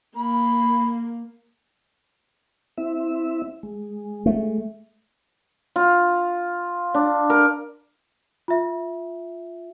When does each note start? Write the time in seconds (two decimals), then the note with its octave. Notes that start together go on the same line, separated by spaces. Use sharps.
0.16 A#3 B5
2.78 C4 E4 E5
3.63 G#3
4.26 A3
5.76 F4
6.94 D4
7.30 A#4
8.48 F4 E5